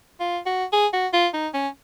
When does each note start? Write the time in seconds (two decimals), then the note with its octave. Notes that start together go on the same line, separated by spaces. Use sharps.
0.20 F4
0.46 F#4
0.73 G#4
0.93 F#4
1.13 F4
1.34 D#4
1.54 C#4